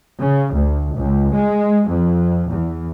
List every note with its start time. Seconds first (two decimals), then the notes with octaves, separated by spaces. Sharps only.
0.20 C#3
0.55 D2
0.97 C#2
1.34 G#3
1.87 F2
2.51 E2